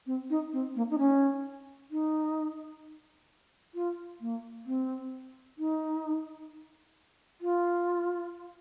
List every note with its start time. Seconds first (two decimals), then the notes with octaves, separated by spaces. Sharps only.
0.06 C4
0.30 D#4
0.53 C4
0.76 A#3
0.90 D#4
0.99 C#4
1.91 D#4
3.74 F4
4.21 A#3
4.66 C4
5.58 D#4
7.41 F4